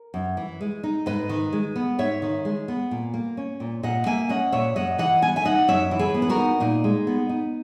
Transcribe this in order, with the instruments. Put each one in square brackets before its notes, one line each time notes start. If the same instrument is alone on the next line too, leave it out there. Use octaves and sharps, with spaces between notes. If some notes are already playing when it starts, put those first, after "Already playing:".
Already playing: [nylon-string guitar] A#4
F#2
E3
G#3
D#4
G#2 B4 D#5
D#3
G#3
B3
G#2 C#5 E5
D#3
G#3
B3
A#2
A#3
C#4
A#2
A#2 D#5 F#5
A#3 E5 G#5
C#4 D#5 F#5
A#2 C#5 E5
F#2 D#5 F#5
E3 D#5 F#5
B3 G#5
E5 G#5
D#4 D#5 F#5
F#2 C#5 E5
E3
G#4 B4
B3
B4
F#4 A#4
D#4
A#2 D#4
G#3
B3
D#4